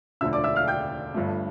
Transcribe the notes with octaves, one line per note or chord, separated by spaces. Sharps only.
E1 D2 D3 F3 E5 E6
D5 D6
E5 E6
F5 F6
G5 G6
G1 G2 F3 A3